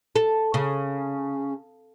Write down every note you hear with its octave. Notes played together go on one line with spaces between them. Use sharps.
A4
C#3